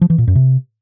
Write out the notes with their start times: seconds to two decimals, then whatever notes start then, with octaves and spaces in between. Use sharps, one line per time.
0.01 F3
0.10 E3
0.18 A#2
0.27 F#2
0.35 C3